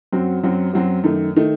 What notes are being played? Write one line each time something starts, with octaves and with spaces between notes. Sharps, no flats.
F#2 F#3 C4 F#4
F#2 F#3 C4 F#4
F#2 F#3 C4 F#4
F#2 D#3 A3
D#3 A3